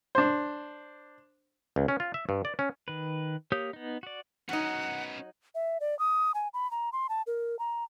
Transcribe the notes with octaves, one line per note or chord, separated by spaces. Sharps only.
D4 C5
C#2
C#4
F4
E5
G2
D5
C#4
D#3 B4
A#3 G4 C#5 D#6 G6
B3 D#4
F#4 D5
F#3 B3 C#4 D#4 F#5
E5
D5
D#6
G#5
B5
A#5
C6
A5
A#4
A#5